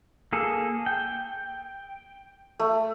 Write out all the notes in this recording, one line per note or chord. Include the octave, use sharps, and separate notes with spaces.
A#3 G#4 A4
G5
A3